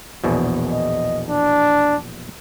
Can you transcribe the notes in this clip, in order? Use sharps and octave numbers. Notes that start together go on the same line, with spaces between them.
A#1 E2 B2
D#5
D4